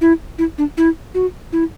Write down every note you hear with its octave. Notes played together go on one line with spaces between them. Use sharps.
E4
E4
D4
E4
F#4
E4